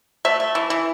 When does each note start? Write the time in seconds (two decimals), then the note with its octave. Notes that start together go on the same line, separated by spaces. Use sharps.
0.25 A3 E5
0.40 A3
0.55 E3
0.70 E3